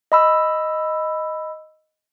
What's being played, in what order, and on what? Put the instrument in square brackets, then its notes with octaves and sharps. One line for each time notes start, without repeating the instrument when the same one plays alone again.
[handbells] D#5 B5 E6